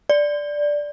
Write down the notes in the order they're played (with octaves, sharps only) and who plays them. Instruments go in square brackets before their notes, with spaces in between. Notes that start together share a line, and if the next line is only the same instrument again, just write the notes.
[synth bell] D5